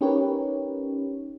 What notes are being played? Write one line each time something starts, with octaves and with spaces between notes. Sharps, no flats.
C#4 D#4 G4 A#4 B4 C#5